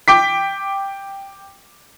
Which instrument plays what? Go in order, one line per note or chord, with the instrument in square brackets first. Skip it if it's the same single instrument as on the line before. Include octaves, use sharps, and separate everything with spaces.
[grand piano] G5 D6 B6